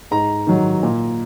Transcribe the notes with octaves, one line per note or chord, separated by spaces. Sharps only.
G#2 A#5
D#3 F#3
A#2